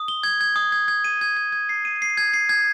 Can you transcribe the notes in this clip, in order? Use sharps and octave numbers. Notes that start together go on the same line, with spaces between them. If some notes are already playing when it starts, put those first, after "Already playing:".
Already playing: D#6
G7
G#6
G#6
D#6
G#6
G#6
D#7
G#6
G#6
G#6
C7
D#7
C7
G#6
C7
G#6